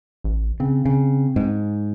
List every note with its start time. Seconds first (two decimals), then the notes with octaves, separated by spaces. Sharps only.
0.24 A1
0.60 C#3 C4
0.85 C#3
1.36 G#2